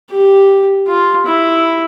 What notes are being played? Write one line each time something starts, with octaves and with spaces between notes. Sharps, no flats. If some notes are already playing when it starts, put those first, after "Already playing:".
G4
F4
E4